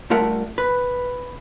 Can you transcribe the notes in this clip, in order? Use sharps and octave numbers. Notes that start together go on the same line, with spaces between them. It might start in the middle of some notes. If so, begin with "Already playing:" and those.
G2 A3 F4 A#4 E5 F#5
B4